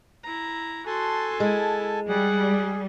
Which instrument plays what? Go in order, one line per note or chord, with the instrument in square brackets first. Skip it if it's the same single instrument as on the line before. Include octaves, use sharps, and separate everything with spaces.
[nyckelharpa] E4 A#5
[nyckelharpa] F#4 C6 [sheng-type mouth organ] A4 G#5 A5
[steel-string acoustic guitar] G#3 [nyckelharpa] E4
[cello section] G3 [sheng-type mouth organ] G#4 [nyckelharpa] F#5